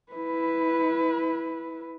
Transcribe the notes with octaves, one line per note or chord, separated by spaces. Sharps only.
E4 B4